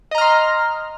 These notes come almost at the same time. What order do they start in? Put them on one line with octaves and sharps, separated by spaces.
D#5 A#5 F6 C6